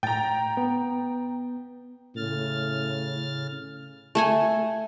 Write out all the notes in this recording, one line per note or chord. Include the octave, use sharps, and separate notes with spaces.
A2 G5 A#5 A6
B3
A2 C#3 F6 A6
A3 A4 G#5